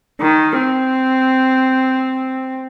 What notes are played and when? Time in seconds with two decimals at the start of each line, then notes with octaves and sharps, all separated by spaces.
0.21 D#3
0.59 C4